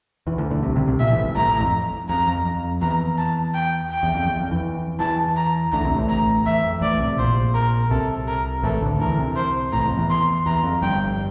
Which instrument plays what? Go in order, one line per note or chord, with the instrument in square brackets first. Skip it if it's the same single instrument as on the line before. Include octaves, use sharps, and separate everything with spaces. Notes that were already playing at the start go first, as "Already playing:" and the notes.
[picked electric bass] E2 E3
D2 D3
D2 D3
C2 C3
C2 C3
C2 C3
[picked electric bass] A#1 A#2 [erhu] E5
[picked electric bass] A1 A2
G1 G2
[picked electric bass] A1 A2 [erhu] A#5
[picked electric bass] A1 A2
F2
[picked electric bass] F2 [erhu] A#5
[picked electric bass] F2
F2
[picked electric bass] E2 [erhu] A#5
[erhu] A5
G5
G5
[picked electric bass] E2
F2
E2
F2
E2 E3
[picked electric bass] E2 E3 [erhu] A5
[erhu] A#5
[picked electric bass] D2 D3 [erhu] A#5
[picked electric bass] C2 C3
A1 A2
[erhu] A#5
[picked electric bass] E2 [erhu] E5
[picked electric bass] F2
[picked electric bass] A1 A2 [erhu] D5
[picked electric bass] C2 C3
[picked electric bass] A#1 A#2 [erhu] C5
[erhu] A#4
[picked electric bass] C2 C3 [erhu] A4
[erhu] A#4
[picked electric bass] A1 A2 [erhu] A4
[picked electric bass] D2 D3
[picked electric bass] E2 E3 [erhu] A#4
[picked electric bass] C2 C3
[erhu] C5
[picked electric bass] A1 A2 [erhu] A#5
[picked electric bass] F2
E2
[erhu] C6
[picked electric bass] E2 [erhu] A#5
[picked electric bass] F2
[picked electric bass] G1 G2 [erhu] G5